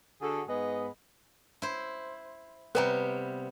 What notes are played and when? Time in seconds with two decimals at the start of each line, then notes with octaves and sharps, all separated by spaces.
0.22 D3 F#4 G#4 A4
0.48 G#2 B3 G#4 B4 D#5
1.62 E4 C5
2.75 C3 G3 B3 B4 A#5